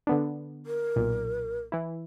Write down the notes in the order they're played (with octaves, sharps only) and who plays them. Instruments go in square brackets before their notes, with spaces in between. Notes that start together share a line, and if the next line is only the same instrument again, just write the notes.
[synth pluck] D3 B3 D4
[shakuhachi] A#4
[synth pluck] B1 A#2
E3 E4